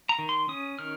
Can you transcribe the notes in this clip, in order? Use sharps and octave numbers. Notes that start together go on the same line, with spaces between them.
A#5
D#3
C6
C#4 D#6
D#3 F6